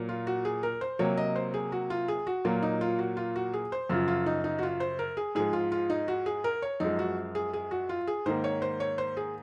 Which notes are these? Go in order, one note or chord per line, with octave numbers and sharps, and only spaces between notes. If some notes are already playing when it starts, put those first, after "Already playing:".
Already playing: A#2 F#3 A#3
F4
F#4
G#4
A#4
C5
C3 F#3 A#3 C#5
D#5
C5
G#4
F#4
F4
G#4
F#4
A#2 F#3 A#3 F4
D#4
F4
F#4
F4
F#4
G#4
C5
F#2 C#3 F3 F4
F4
D#4
D#4
F#4
F4
C5
A#4
G#4
G#2 F3 G#3 G#4
F4
F4
D#4
F#4
G#4
A#4
C#5
F#2 F3 G#3 D#4
F#4
G#4
G#4
F#4
F4
G#4
G#2 D#3 A#3 C5
C#5
C5
C#5
C5
G#4